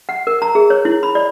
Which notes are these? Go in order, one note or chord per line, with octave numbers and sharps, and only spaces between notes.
F#5
A#4
A#5
G#4
C#5
E4
B5
D5